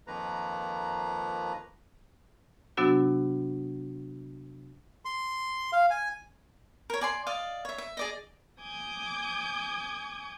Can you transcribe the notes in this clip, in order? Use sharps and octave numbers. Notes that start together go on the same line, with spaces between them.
F2 D#3 F3 A#3 B4 A#5
C3 F#3 B3 D4 F#4 E6
C6
F5
G#5
A#4 C#5
D5 G#5 C6
D5 D#5 F5
C#5 E5
E5
G#4 D5 D#5
G#5 D6 D#6 G6 G#6